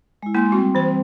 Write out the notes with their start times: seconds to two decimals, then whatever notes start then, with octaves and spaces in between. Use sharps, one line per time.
0.23 G#3 E4
0.34 G#3 A#3 E4 G#5 C6
0.52 G3 C4 F#4
0.75 E3 C5